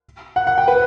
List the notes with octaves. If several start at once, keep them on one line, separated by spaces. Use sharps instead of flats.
F#5
F#5
G5
B4